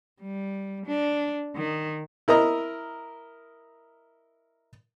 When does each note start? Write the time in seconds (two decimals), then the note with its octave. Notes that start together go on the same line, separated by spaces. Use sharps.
0.21 G3
0.86 D4
1.56 D#3
2.28 E4 A#4 D#5 A#5